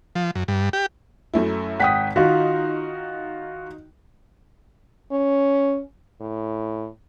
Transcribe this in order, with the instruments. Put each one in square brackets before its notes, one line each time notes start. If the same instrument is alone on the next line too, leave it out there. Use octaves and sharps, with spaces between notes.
[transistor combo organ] F3
F#2
G2
G4
[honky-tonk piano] F#2 A3 E4
[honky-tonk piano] G#1 B6 [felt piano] F#5 G5 D#6
[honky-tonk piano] D#3 D#4 [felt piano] F4 F#4
[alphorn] C#4
A2